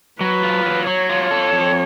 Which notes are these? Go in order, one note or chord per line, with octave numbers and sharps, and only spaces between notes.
F#3 B4
F4
F#3
F#3 C#5
F4
A4
F2